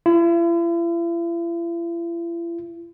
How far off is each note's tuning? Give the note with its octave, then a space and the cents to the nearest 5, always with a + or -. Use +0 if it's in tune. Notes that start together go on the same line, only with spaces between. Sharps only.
E4 +45